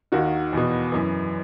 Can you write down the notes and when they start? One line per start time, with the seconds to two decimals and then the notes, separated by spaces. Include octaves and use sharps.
0.12 D#2 D#3 F#4
0.53 E2 B2
0.92 F#2 E3